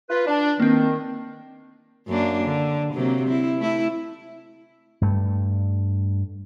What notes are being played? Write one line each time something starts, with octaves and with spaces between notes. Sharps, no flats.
F4 B4
D4
D#3 A#3 C4
F#2 A#3 D4
D3
C3 F#3 A#3
C4 E4
A3 E4
G2 A3